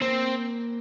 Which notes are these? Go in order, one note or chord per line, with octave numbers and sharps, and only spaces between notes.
A#3 C4